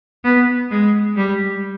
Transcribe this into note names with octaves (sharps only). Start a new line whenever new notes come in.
B3
G#3
G3